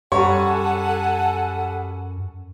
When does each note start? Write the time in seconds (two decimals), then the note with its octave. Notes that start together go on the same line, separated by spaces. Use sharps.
0.12 F#2 G3 A4 C#5 F#5 G#5 A#5